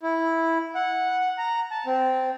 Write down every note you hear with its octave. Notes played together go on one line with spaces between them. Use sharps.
E4
F#5
A#5
A5
C4